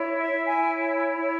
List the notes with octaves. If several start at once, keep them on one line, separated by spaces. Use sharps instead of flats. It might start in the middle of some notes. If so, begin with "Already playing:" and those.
Already playing: E4 C#5
E5
E4
G#5
C#5
E4